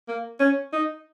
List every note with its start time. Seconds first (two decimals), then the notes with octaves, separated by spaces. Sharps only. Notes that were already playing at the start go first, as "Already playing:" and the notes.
0.08 A#3
0.40 C#4
0.73 D#4